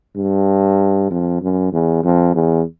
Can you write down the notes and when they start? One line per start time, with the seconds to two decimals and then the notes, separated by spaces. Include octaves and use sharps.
0.16 G2
1.11 F2
1.42 F#2
1.73 E2
2.04 F2
2.35 E2